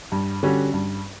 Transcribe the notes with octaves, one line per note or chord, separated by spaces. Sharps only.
G2
D3 G3 C#4 F#4
G2